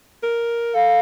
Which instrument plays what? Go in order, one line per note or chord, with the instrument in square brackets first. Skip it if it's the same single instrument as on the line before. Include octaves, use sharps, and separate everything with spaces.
[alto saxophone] A#4
[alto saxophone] A4 [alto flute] F5